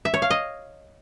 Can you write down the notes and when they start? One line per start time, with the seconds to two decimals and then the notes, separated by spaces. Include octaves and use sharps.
0.05 E5
0.14 C#5
0.22 F5
0.30 D#5